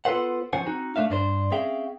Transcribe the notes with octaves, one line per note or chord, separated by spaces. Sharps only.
B3 F4 A4 B4 C5 F#5
F3 C#4 C5 F#5 G#5
C4 D#4 F#4
A3 D4 E5 F5
G2 D4 C5
C4 C#4 G#4 E5 F5 G5